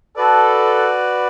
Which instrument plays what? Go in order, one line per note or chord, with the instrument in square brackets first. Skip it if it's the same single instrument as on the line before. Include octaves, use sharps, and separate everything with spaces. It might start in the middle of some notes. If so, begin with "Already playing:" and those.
[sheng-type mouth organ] F#4 B4 D5 [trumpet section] A4